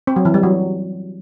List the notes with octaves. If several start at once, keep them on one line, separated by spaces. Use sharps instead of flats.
C4
F#3
E3
G3
F#3